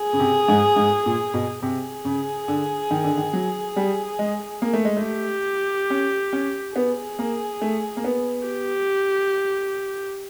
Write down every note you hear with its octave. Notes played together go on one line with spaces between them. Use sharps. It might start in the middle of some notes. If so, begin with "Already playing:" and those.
Already playing: G#4
C#3
C3
G#2
G#2
A#2
B2
C3 G#4
C#3
D3
D#3
D3
D#3
F#3
G3
G#3
A#3
A3
G#3
A3
G4
C#4
C#4
B3 G#4
A#3
A3
A#3
B3
G4